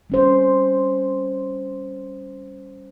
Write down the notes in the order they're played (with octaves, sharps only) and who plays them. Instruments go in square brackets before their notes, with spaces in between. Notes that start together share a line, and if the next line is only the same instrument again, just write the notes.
[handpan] G3 C#4 C5